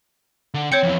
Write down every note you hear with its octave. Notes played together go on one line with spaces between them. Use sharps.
D3
C4 C#5 G5 G6 C#7
F2 E3